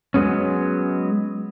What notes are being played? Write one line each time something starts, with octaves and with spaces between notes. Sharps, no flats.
F#3 G#3 B3 C#4